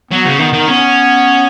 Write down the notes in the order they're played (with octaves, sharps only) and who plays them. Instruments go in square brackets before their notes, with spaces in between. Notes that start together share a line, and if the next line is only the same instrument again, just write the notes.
[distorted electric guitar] F#3 [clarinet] B3
[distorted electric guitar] C#3
[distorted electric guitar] D#3 [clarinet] B3
[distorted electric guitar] D#3
[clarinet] B3 [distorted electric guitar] C#4